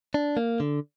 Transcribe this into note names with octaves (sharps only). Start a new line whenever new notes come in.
D4
A#3
D3